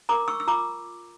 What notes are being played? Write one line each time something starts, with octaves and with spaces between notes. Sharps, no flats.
A#4 A#5 D6
C#6 E6
E6
F4 A#5 D6